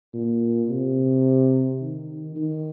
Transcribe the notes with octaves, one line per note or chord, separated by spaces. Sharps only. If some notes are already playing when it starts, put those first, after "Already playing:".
A#2
C3
D#3
D#3